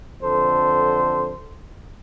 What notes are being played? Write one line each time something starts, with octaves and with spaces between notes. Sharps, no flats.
F2 D3 A4 C5